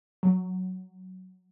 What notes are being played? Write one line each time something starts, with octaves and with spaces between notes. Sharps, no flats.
F#3